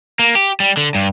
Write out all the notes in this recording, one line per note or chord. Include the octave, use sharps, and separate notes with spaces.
A#3
G4
G3
D3
G2